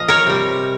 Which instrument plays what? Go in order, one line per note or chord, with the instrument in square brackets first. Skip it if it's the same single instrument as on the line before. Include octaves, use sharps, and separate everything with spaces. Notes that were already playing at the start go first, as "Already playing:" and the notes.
Already playing: [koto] A#2 F3 D#5 F5
A#4 C#5
C3 G3